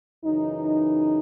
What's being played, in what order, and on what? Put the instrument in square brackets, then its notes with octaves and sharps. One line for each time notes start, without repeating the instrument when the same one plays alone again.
[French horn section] F#2 C#3 E3 D#4